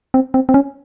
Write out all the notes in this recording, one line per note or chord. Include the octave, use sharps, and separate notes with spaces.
C4
C4
C4
C#4